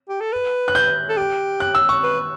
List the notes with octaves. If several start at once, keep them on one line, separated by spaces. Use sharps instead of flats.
G4
A4
B4
F#6
G6
A4
G4
F#6
E6
C#6
B4